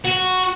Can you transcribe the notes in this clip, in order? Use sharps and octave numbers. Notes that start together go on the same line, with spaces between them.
F#4